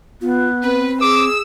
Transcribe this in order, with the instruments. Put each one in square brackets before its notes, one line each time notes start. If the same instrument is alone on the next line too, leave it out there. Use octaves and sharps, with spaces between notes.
[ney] B3 [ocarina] F4
[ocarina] C4 [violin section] B4
[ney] G#4 [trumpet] D6 [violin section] E6